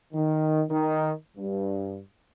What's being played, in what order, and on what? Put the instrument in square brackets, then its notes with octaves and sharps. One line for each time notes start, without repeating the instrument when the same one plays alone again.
[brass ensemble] D#3
D#3
G2